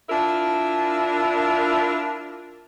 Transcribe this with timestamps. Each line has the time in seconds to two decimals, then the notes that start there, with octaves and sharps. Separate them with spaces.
0.09 D4 E4 F4 A#4